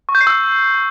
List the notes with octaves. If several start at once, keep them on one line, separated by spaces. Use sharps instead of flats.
C#6
G6
C7
E6